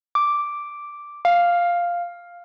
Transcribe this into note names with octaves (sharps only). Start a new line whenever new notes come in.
D6
F5